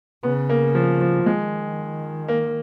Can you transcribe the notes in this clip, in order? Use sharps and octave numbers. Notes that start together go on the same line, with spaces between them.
C#3 B3
A#3
F3
F3
D#3 G#3
A#3